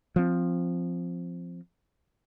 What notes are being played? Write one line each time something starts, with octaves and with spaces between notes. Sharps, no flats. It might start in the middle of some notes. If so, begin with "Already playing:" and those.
F3 C4